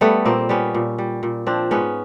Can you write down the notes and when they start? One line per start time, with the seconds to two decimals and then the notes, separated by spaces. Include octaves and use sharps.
0.01 G3 A3 B3
0.25 A#2 A#3 C4
0.49 G3 B3 C#4
0.75 A#2
0.98 G3
1.23 A#2
1.47 F3 C4 D4
1.71 G#2 B3 C#4